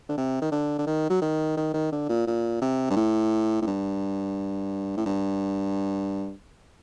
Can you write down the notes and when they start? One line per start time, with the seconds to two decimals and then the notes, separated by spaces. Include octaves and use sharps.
0.09 D3
0.17 C3
0.41 D#3
0.51 D3
0.79 D3
0.86 D#3
1.10 F#3
1.22 D#3
1.57 D#3
1.74 D#3
1.92 D3
2.09 A#2
2.27 A#2
2.62 C3
2.90 G2
2.96 A2
3.61 A2
3.67 G2
4.97 A2
5.06 G2